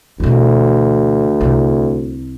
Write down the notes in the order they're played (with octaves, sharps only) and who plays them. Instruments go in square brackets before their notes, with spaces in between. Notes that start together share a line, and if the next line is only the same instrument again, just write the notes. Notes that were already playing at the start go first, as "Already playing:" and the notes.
[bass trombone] D2 [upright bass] B2 E3
[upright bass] C2 C3